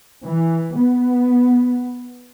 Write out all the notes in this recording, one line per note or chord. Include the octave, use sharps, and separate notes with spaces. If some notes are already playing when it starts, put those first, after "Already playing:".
E3
B3